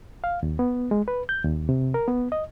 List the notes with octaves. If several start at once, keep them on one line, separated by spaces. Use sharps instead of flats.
F5
D#2
B3
G#3
B4
G6
D#2
C3
A#4
B3
D#5